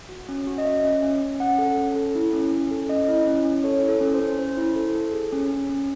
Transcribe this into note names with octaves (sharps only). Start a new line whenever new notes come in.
F#4
C#4
F#4
D#5
C#4 E5
C#4
C#4
C#4
C#4 F#5
A4
C#4
A4
E4
C#4
C#4
A4
C#4 D#5
E4
C#4
C#4
A4 C#5
E4
A4
C#4
C5
C#4
C#4 C5
E4
A4
A4
G#4
C#4
C#4
C#4